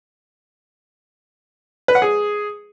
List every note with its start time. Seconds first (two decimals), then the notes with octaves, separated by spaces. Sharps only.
1.88 B4
1.95 F#5
2.02 G#4